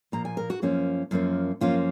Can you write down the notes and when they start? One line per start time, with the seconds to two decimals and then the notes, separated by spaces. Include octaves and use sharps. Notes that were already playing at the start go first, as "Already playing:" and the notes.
0.12 A#2 F3 A#3 A#5
0.25 G#5
0.37 A#4
0.50 F#4
0.62 F#2 F3 A#3 C#4
1.11 F#2 F3 A#3 C#4
1.61 F#2 F3 A#3 C#4 F4